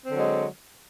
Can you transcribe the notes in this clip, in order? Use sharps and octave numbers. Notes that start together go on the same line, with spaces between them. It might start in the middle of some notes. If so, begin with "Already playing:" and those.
D3 F#3 G#3 C4